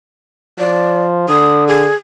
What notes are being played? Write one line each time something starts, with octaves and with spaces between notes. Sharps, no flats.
F3 D5
D3 D#6
G#4